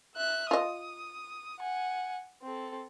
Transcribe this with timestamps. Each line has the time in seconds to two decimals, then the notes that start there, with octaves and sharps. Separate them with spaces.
0.15 E5 F#6
0.51 F4 D#5 D#6
1.60 F#5 G#5
2.42 C4 A4